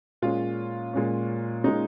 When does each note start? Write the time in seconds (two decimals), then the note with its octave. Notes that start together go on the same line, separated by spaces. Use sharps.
0.22 A#2 G#3 C#4 F4
0.93 A#2 G#3 C#4
1.64 A#2 G#3 C#4 D#4